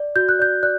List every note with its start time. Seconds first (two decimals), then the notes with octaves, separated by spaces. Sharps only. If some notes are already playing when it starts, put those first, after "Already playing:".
Already playing: D5
0.16 F#4 G6
0.29 F#6
0.39 D5 G6
0.63 D5 F#6